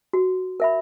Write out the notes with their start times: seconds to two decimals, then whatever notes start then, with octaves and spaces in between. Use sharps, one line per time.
0.13 F#4
0.60 A#4 E5 B5